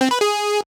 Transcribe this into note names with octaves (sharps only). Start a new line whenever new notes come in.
C4
B4
G#4